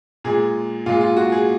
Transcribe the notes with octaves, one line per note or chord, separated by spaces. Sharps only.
A#2 G#3 G#4
A#2 G#3 F4
F4
F#4
G#4